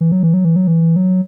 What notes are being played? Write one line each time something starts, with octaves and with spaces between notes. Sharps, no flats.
E3
F#3
E3
F#3
E3
F#3
E3
F#3